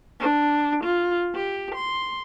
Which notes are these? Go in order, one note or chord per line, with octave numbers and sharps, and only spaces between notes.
D4
F4
G4
C6